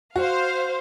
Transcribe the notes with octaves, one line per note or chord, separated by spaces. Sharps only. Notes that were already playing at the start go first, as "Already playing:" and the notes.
F#4 C5 F5